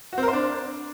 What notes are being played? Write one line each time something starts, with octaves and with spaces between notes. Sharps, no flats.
F#4
C4
A#4
C5
D4